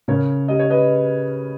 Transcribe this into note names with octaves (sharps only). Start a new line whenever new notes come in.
C#3 A#4 C#5
G3 D#5
C#5
B4 D#5